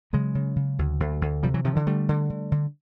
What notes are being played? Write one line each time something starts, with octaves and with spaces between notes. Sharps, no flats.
C#3 F#3 G#3
C#3
C#3
D2
D2
D2
C3 F3 G3
E3 F#3
C3 D#3 F3
D3 E3
D3 G3 A3
D3
D3
D3